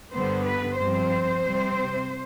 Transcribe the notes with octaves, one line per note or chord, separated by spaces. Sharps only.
G2 D3 G3 B3 C5
B4
G2 F3 C4 C5
C3 G3 C4